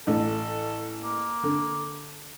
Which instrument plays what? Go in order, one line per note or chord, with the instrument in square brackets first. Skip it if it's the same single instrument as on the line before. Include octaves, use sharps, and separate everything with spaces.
[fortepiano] A1 A3 [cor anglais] A4
[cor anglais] A#3
[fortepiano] D3